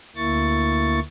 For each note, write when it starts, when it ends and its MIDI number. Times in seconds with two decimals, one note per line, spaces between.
0.16 1.00 38
0.16 1.00 58
0.16 1.00 64
0.16 1.00 85
0.16 1.00 93